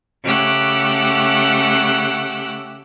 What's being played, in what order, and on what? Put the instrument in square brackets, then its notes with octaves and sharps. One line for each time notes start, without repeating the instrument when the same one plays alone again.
[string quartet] C#3 A3 G4 F#5 E6 F#6